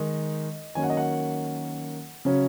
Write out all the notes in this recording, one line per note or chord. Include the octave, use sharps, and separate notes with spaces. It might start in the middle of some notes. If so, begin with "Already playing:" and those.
Already playing: D#3 G#3 D#4 D#5
D#3 F#3 A#3 C#4 G#5
F#5
D#5
F#5
C#3 F#3 C#4